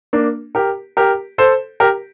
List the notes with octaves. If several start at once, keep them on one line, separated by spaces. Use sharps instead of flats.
A#3 D4
G4 A#4
G4 A#4
A4 C5
G4 A#4